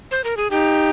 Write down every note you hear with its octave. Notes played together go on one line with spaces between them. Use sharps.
C5
A#4
G#4
D#4 G4